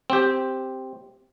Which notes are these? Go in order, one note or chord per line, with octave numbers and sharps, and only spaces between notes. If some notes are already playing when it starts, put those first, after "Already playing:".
C4 G4